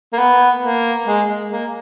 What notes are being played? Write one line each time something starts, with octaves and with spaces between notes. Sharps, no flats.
A#3
B3
A#3
G#3
G#3
A#3